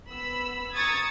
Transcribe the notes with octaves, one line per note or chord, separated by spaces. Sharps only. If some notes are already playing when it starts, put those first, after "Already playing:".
B3 B5 E6
A#5 C#6 D#6 E6 G#6 A6